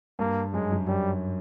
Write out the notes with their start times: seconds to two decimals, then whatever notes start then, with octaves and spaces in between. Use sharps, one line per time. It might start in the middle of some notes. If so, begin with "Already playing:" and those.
0.19 G2 A#3
0.53 F#2 G#3
0.72 F#2
0.87 F#2 G3